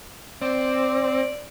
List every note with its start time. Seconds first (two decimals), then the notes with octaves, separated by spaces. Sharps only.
0.42 C4 D5